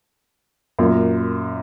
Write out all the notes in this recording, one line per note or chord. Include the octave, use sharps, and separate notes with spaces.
F#2 A#2